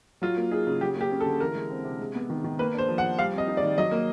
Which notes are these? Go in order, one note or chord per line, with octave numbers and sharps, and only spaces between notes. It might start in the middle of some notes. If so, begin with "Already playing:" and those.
F#3 F4
A#3
D#4 G#4
C#3
F#3 G4
A#3 G4
C#4
A4
D3
E3 A#4
G#3
C4
C3
G#3
B3
D#3
D#3
A#3 B4
D4 C5
F3
F#5
F3
G3 F5
C4 D#5
D#4
D5
D#3
F#3 D#5
A#3